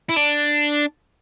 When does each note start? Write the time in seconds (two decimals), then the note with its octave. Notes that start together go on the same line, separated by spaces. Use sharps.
0.09 E4
0.16 D4